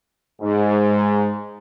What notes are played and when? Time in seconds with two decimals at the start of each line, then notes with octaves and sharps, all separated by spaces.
0.42 G#2